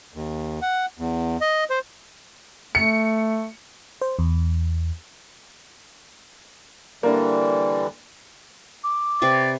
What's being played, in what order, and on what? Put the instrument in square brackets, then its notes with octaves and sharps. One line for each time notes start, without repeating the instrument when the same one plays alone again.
[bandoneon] D#2
F#5
E2
D#5
C5
[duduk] A3 [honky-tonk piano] C#7
[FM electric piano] C5
E2
[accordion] D3 E3 G3 [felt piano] A#3 D4
[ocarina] D6
[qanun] C3 B4 C#6 [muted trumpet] D5